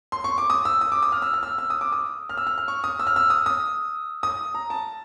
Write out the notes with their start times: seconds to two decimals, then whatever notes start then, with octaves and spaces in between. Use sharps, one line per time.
0.12 C6
0.24 C#6
0.38 D6
0.50 D#6
0.65 E6
0.81 D#6
0.92 D6
1.02 D#6
1.12 F6
1.22 E6
1.34 F6
1.43 E6
1.58 E6
1.70 D#6
1.81 D6
1.92 D#6
2.29 F6
2.37 E6
2.47 F6
2.58 F6
2.68 C#6
2.84 D#6
2.99 E6
3.07 F6
3.16 E6
3.30 D#6
3.46 D#6
4.23 D#6
4.55 A#5
4.70 A5